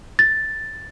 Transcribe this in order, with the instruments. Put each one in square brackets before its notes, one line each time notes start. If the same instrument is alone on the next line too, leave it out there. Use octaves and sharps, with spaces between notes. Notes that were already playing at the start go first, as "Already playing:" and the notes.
[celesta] A6